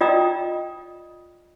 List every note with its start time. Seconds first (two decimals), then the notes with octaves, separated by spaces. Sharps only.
0.01 F4 D5 D#5 G5 A#5 D#6